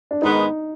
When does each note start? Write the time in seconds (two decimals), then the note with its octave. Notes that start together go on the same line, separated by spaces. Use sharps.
0.11 D4
0.22 G#2 D#3 G#3 B3 D#4